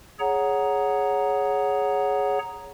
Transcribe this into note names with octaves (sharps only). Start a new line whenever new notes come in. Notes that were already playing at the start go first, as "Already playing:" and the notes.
G#4 C#5 F#5 A#5